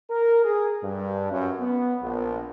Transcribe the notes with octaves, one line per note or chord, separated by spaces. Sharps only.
A#4
G#4
G2
F#2
B3
A#1